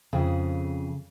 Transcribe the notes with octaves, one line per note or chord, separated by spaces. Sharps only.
F2 C#3 G#4